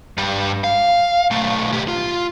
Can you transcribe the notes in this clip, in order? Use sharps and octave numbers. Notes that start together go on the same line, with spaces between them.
G2 G3
F5
B1 A3
B2 G4
F4